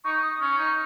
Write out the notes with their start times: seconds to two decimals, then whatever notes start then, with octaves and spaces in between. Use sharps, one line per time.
0.04 D#4 C#6
0.23 D#6
0.41 C#4 C#6
0.58 D#4